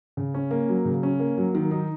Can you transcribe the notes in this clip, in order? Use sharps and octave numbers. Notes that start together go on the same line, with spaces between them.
C#3
C#4
A#3
F#3
C#3
C#4
A#3
F#3
D#3
D#4